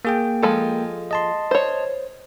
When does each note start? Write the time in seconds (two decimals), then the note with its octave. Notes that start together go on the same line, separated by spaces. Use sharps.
0.05 A#3 G#4 G5
0.42 F3 G#3 A4
1.11 D#5 A5 C6
1.51 C5 C#5